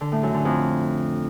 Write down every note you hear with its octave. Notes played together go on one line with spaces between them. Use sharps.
D3
A2
F#2
D3
F2